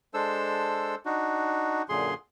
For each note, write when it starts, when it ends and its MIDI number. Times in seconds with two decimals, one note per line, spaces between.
0.14 0.95 56
0.14 0.95 62
0.14 0.95 69
0.14 0.95 72
0.14 0.95 88
1.05 1.82 62
1.05 1.82 63
1.05 1.82 66
1.89 2.14 42
1.89 2.14 46
1.89 2.14 50
1.89 2.14 68
1.89 2.14 84